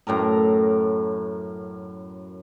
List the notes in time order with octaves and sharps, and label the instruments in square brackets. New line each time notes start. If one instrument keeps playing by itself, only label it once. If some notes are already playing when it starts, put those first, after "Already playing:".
[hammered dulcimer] F#2 A2 A#4 A#5